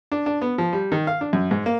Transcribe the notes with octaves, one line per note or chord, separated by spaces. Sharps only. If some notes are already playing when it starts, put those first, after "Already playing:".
D4
D4
B3
F3
G3
D#3
F5
D4
F#2
G#2
A#3